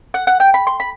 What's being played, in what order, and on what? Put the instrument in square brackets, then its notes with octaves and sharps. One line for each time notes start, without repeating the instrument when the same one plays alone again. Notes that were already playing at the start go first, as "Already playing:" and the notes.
[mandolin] F#5
F#5
G5
B5
C6
B5